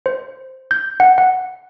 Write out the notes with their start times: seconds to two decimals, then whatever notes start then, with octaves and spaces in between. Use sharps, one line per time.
0.06 C5
0.71 G6
1.00 F#5
1.18 F#5